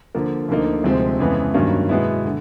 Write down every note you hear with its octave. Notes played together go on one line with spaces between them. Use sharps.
D3 F3 A#3
D2 D3 F3 A#3 D#4
D2 C3 F3 G#3 C4
F2 C#3 E3 G#3 B3
G2 D#3 F#3 A#3 C#4
B2 G#3 B3 E4
D3